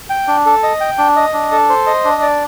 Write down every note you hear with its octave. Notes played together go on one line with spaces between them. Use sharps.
G5
D4
A4
D#5
G5
D4
D#5
D4
A4
C5
D#5
D4
D5